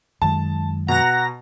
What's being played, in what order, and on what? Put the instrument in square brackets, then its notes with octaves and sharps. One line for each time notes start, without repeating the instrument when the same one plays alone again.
[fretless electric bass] F#2 D#3 G#3 [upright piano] A5
[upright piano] B2 [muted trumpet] F#5 [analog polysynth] A#5 A#6